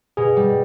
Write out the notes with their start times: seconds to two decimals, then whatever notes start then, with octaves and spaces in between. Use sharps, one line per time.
0.17 B2 G#4
0.36 G3